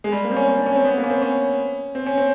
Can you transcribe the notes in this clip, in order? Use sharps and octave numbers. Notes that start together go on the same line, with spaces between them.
G#3
G3
A#3
C4
C#4
C#4
D4
C#4
C4
B3
A#3
C#4
C4
C#4
C4
C#4
C4